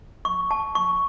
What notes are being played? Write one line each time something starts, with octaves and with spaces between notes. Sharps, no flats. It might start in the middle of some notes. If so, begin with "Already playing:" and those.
C#6
A5
C#6